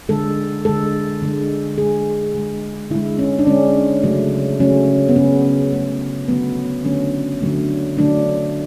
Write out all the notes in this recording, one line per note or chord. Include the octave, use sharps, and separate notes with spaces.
D3 G#3 A4
D3 G#3 A4
D3 G#3
D3 G#3 G#4
D3 G#3
D3 G#3 E4
C#4
D4
D3 G#3 C#4
C#3 F#3 A3
C#3 F#3 A3 C#4
B3
C#3 F#3 A3 C#4
C#3 F#3 A3
D3 F#3 A3 B3
D3 F#3 A3 C#4
D3 F#3 A3
D3 F#3 A3 D4